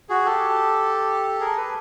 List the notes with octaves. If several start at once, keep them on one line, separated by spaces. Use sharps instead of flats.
F#4 G#4
G4 A4
G#4 A#4
A4 B4